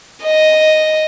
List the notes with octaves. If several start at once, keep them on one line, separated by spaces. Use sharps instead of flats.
D#5